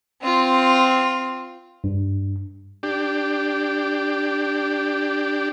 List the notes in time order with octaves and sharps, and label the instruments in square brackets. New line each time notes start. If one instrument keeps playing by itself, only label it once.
[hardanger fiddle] C4 F4
[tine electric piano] G2
[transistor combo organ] D4 G4